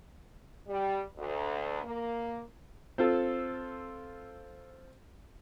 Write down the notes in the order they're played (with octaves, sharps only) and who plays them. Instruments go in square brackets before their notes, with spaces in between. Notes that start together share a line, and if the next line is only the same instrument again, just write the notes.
[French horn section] G3
D2
A#3
[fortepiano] C4 F4 A4